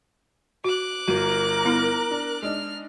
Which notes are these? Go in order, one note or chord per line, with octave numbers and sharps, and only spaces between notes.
F#4 D6 F#6
G1 F#4 A#4 D#7
B3 E4
D4
G#3 D4 D#4 F6